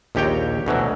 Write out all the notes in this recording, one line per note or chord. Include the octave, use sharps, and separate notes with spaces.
A#1 D#2 G4 C#5 G5 A#5
D2 B2 E3 F#3